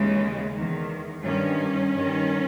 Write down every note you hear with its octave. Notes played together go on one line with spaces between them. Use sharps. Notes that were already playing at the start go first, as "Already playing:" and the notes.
Already playing: D#2 C#3 E3 G#3
E2 D#3
G2 D#3 C#4
G2 D#3